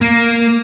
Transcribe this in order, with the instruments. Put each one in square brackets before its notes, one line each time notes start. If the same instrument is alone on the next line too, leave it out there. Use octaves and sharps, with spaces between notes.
[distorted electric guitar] A#3